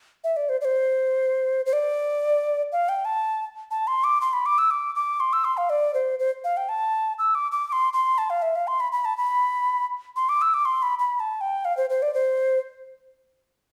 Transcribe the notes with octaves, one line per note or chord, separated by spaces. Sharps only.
E5
D5
C5
D5
C5
C5
D5
F5
G5
A5
A5
C6
D6
C6
B5
D6
E6
D6
D6
C6
E6
C6
F5
D5
C5
C5
F5
G5
A5
E6
D6
D6
D6
C6
C6
A5
F5
E5
F5
C6
B5
B5
A5
B5
C6
D6
E6
D6
C6
B5
B5
B5
A5
G5
F5
C5
C5
D5
C5